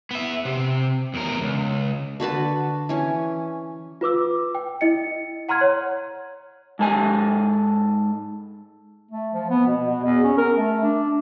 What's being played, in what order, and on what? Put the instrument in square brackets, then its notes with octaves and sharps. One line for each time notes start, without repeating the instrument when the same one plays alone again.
[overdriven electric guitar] B3 E5
C3
E2 A#4
C#2
[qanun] D3 F#4 B4 A5
E3 C#4
[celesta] F4 B4 D6 E6
G5
E4 D#5 C#7
F#5 A#5 C6 F6 G#6
C#5
[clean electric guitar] G#2 A4 G#5
[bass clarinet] A3
F3
B3
B2
B2
E2
C#4
A#4
A3
D4